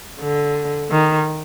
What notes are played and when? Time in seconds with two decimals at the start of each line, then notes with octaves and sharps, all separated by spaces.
0.20 D3
0.90 D#3